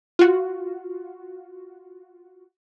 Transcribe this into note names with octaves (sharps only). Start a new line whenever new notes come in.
F4 F#4